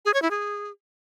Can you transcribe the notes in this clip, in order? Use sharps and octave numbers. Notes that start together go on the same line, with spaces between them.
G#4
C#5
E4
G#4